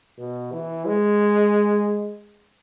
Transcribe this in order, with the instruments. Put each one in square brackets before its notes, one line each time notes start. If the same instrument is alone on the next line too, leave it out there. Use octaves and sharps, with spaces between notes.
[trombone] B2
E3
G#3